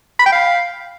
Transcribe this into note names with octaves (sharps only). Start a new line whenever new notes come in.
B5
G5
F5